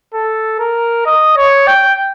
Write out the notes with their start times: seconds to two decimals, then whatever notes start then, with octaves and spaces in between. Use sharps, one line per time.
0.14 A4
0.59 A#4
1.06 D#5
1.37 C#5
1.68 G5